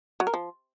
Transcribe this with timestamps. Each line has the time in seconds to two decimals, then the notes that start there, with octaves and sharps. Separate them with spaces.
0.20 F#3
0.27 A#4
0.34 F3